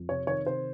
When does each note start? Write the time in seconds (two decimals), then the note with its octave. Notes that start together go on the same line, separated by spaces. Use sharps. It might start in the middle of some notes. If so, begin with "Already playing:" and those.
Already playing: F2
0.09 C3 C#5
0.27 D#3 C#5
0.46 C3 C5